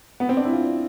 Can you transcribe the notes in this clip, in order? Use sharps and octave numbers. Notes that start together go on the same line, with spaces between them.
B3
C4
D4
E4
F4